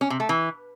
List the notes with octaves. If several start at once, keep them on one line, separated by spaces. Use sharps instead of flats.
C#4
C3
A3
E3